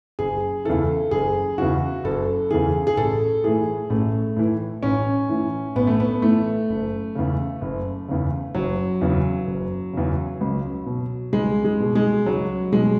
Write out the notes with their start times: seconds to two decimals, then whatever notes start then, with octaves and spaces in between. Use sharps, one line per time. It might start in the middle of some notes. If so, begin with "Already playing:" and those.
0.19 F#1 G#4
0.65 E2 C#3 E3 A4
1.11 F#1 G#4
1.58 E2 C#3 E3 F#4
2.04 F#1 A4
2.51 E2 C#3 E3 G#4
2.87 G#4
2.97 A1 A4
3.44 A2 E3 G#4
3.90 A1 A3
4.37 A2 E3
4.83 A1 C#4
5.29 A2 E3
5.75 A1 B3
5.87 A3
6.00 B3
6.22 A2 E3 A3
6.69 F#1
7.15 E2 C#3
7.61 F#1
8.08 E2 C#3
8.55 F#1 F#3
9.01 E2 C#3
9.47 F#1
9.93 E2 C#3
10.41 C#2
10.86 B2
11.33 C#2 G#3
11.65 G#3
11.80 B2
11.95 G#3
12.26 C#2 F#3
12.73 B2 G#3